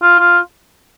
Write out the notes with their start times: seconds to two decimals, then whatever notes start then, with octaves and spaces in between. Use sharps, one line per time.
0.02 F4
0.19 F4